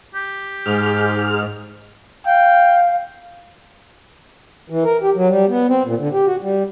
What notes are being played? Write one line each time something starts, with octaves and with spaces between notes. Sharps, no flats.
G4
G#2 G#4 F6
F5 G5
E3
A#4
G4
F#3
G3
B3
C4
A#2
D3
G4
F#4
G3